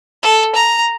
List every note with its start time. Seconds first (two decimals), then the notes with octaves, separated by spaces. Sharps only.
0.23 A4
0.55 A#5